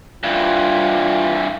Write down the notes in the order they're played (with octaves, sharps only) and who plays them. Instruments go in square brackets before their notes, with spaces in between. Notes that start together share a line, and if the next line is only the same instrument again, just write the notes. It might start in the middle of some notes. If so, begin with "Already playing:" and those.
[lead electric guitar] G2 E3 [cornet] F4